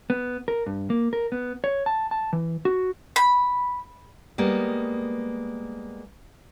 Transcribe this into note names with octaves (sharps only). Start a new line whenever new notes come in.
B3
A#4
G2
A#3
A#4
B3
C#5
A5
A5
E3
F#4
B5
G3 G#3 A#3 B3